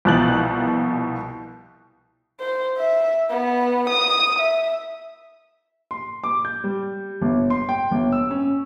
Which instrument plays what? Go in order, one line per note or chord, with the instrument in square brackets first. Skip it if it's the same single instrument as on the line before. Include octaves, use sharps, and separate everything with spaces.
[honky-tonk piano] C2 B2 F3 F#6 A6 F#7
[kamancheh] C5
E5
B3
D#6
E5
[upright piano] C6
D6
G6
G3
G1
C6
G5
G1
E6
C#4